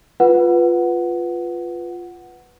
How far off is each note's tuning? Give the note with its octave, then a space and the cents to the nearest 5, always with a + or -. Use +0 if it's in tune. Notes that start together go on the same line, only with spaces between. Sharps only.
F4 +0 B4 +0 F#5 +0